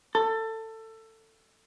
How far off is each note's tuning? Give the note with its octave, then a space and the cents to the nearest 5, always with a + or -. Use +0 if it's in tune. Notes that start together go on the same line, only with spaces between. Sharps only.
A4 +20